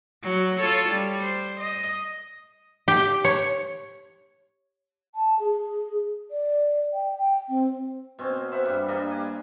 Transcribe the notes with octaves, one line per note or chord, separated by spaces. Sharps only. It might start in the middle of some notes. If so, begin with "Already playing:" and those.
F#3
F4 A4 C#5
G3
C5
D#5
G4
C#5
A5
G#4
D5
G5
G5
C4
B2 C4 C#4
C5 E5 F#5 B5
G2 G3
G3 A#3 D4 D#5
G#5